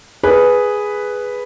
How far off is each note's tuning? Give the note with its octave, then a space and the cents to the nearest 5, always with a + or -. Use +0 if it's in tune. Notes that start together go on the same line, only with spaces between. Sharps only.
G#4 +0 B4 +0